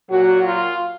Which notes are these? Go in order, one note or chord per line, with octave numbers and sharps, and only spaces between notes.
A#2 F#3 F#4
F4